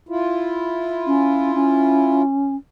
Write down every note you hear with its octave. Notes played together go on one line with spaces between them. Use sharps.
E4 F4
C#4
C#4